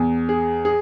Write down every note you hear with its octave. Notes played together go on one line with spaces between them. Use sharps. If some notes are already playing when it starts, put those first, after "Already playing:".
Already playing: E2
G#4
G#4